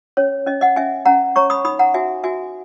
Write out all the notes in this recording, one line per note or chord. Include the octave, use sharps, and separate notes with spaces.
C#4 C#5
C#4 D#5
D#5 F#5
C#4 E5 G#5
C#4 F#5 A#5
C#5 A#5 C#6
B5 D#6
D#4 B5 D#6
F#5 A#5
F#4 E5 G#5
F#4 E5 G#5